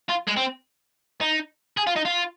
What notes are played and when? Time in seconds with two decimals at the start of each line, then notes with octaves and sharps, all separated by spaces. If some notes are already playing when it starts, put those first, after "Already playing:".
0.09 F4
0.27 G#3
0.37 C4
1.21 D#4
1.77 G#4
1.87 F4
1.96 D#4
2.05 F4